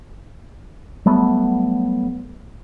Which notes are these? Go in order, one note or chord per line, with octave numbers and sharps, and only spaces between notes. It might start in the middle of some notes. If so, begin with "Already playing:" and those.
F#3 G3 A3 B3